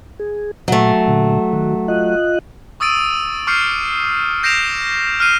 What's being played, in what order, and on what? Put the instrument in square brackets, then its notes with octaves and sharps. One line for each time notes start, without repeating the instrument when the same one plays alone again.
[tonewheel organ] G#4
[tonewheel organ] A#2 [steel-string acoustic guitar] F#3 A3
[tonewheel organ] A#2 D3
D#3 F#4
F4 D#5 F#6
[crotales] C#6 D#6 E6 A6 D7 D#7
C#6 D6 F6 G6 C7 C#7
G6 A#6 C7 D7 E7 F7
F6 F#6 C7 D#7